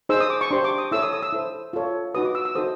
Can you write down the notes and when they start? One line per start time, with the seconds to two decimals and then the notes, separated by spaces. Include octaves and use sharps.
0.09 D#4 G#4 C5 E6
0.20 D#6
0.30 D6
0.41 C#6
0.51 D4 G4 C5 C6
0.64 D6
0.78 D#6
0.92 E4 A4 C#5 E6
1.02 D#6
1.13 D#6
1.23 E6
1.32 E4 A4 C5
1.73 F4 A4 C#5
2.14 D#4 F#4 B4 D#6
2.25 D6
2.35 E6
2.45 E6
2.55 D#4 F#4 A4 C5 D#6